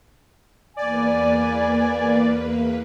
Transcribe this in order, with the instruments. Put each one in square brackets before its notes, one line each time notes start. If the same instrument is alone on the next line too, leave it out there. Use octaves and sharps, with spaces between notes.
[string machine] E2 A#3 B4 [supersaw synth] D5 [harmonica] G#5